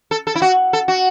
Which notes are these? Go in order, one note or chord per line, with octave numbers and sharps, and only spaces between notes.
A4
A4
E4
F#4
A4
F#4